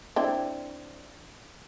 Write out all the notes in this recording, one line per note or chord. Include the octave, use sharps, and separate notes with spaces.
C4 D4 E4